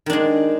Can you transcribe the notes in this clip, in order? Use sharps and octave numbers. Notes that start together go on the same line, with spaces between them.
D#3 G#3 D4